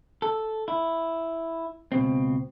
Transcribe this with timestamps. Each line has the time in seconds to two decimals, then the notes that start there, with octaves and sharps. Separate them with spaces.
0.22 A4
0.68 E4
1.92 C#2 B2 C4